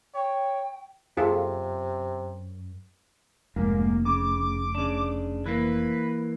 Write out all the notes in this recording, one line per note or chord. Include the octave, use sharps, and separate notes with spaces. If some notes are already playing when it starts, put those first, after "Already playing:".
C#5 G5
F#2 C3 F4 G#4 A4
F1 G#2 A#3
C#3 D6
C#3 D4
E3 A#3 B4